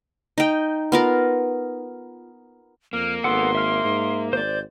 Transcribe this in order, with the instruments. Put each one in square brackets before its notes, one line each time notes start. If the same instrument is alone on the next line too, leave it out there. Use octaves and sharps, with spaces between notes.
[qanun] D#4 G5
B3 F4 A#4
[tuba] F2 [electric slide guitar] A#3 [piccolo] F6
[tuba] G#1 [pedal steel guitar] B3 A4 F#5 [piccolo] C6
[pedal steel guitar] E5 F6
[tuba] G#2
[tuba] G#1 [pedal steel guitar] C5 D5 [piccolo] G6